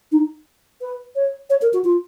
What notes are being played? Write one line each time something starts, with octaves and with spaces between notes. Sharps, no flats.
D#4
B4
C#5
C#5
A#4
F#4
F4